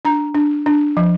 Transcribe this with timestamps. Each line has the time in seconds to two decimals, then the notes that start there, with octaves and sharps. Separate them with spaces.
0.05 D4 A#5
0.35 D4
0.66 D4
0.97 F3